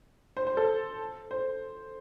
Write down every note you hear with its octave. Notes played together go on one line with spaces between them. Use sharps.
C5
C5
A4
C5